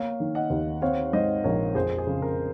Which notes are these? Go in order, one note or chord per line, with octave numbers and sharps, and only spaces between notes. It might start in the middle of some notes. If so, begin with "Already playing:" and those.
Already playing: A#3 C#5 F5
D#3
D#5 F#5
D#2
C4 C#5 F5
G#2 C5 D#5
A#1 A#4 C#5
F2 G#4 C5
G#4
C#3
A#4